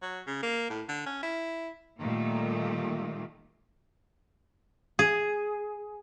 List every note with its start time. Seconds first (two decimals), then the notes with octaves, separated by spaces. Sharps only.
0.02 F#3
0.27 C#3
0.43 A#3
0.70 A2
0.89 D3
1.06 C#4
1.23 E4
2.00 A#2 D#3 G3 A3 A#3
4.99 G#4